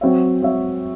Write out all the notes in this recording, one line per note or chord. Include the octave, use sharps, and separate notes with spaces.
F#3 C4 F#4 C#5 E5
F#3 C4 F#4 C#5 E5